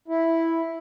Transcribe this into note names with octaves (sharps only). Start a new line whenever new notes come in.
E4